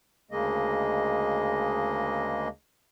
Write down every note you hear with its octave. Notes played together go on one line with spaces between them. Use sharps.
D2 C#3 G#3 A#3 D#5